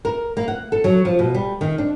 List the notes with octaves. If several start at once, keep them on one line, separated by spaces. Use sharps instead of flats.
A#4
A#3
F#5
A4
F#3
F3
B2
G3
D#3
D4